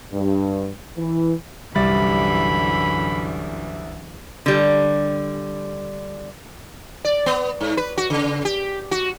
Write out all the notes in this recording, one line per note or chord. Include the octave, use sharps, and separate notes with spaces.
G2
E3
C2 F#2 D3 E3 G3 B5 A6
D3 G3
D5
B3
G#2
B4
F#4
C#3
G4
F#4